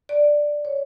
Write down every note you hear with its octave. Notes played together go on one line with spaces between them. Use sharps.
D5
C#5